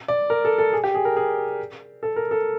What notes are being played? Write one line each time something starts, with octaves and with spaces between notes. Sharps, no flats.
D5
A#4
A4
A4
G#4
G4
G#4
A#4
G#4
A4
A#4
A4